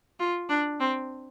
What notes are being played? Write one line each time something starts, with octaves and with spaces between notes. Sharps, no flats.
F4
D4
C4